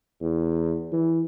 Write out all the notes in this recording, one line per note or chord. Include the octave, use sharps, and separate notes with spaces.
E2
E3